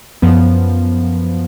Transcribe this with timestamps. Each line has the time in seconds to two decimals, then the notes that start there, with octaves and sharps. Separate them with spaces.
0.22 F#2 F3 B3